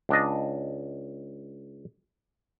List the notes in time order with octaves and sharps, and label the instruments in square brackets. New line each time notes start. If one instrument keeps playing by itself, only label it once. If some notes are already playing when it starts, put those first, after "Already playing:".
[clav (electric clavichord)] C#2 D4 D#5